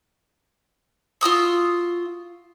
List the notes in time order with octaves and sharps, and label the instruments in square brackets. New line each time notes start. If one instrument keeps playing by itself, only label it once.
[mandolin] F4 F#4 D#6 E6